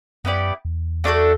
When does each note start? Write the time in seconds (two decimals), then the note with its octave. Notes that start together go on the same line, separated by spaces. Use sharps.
0.24 F#2 B3 E4 G4 D5
0.65 E2
1.04 A3 D4 F#4 A4